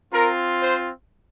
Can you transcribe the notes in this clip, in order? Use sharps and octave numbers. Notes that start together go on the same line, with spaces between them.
C4 F4 A#4
C5